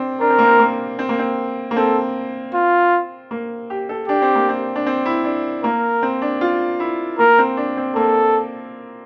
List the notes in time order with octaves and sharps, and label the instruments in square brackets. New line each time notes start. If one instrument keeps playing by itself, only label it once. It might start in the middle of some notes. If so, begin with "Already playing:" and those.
Already playing: [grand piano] C4 D4
[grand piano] D4 [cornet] A#4
[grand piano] C4
A#3
C4
A#3
C4
A#3
C4
A#3
[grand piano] C4 [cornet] A4
[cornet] F4
[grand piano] A#3
G4
A4
[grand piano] D4 [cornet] G4
[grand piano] C4
A#3
C4
D4
C4
E4
D4
[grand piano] A#3 [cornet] A#4
[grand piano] C4
D4
F4
E4
[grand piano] A#3 [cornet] A#4
[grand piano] C4
D4
C4
[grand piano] A#3 [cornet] A4